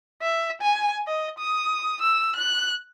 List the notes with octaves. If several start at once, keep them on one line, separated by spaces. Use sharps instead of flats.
E5
G#5
D#5
D#6
E6
F#6